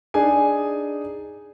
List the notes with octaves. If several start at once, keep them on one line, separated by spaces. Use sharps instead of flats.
D4 D#4 G#4 G#5